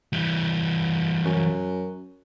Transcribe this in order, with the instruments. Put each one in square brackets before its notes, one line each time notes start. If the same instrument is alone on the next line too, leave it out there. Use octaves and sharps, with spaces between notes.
[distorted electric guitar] E3 G3
[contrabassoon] F#2